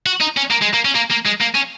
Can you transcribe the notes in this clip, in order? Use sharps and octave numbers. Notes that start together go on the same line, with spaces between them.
F#4
D#4
C#4
A#3
G#3
A#3
C#4
A#3
A#3
G#3
A#3
C#4